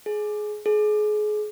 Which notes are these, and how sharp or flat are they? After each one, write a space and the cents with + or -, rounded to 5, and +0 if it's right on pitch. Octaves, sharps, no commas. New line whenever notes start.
G#4 +20
G#4 +30